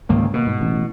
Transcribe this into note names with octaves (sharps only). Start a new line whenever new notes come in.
C#2 G#2 D#3 A#3
B2 A#3
G#2
A1